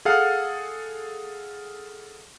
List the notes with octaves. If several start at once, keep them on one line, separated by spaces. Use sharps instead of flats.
G#4 A4 F5 F#5